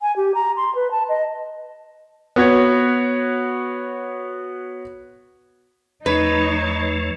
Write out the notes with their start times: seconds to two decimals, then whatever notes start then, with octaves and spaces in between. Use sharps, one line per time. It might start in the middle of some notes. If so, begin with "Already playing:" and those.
0.01 G#5
0.16 G4
0.34 A#5
0.57 C6
0.75 B4
0.91 A5
1.09 D#5
2.36 B3 F#4 C#5
6.06 E2 F3 A3 D#4 B4 C#5